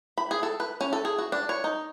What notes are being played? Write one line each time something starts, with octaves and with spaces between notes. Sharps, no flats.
B5
G#4
A4
B4
C#4
A4
G#4
F#4
D4
C#5
D#4